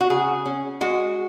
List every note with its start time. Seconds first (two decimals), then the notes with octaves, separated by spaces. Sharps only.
0.01 F#4
0.10 C#3 G#4
0.46 C#4
0.81 G#3 F#4